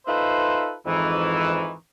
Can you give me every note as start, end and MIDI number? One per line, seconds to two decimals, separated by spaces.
0.07 0.74 63
0.07 0.74 65
0.07 0.74 69
0.07 0.74 71
0.07 0.74 72
0.07 0.74 76
0.86 1.73 41
0.86 1.73 44
0.86 1.73 51
0.86 1.73 52